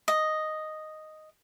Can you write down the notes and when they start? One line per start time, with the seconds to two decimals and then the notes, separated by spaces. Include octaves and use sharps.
0.08 D#5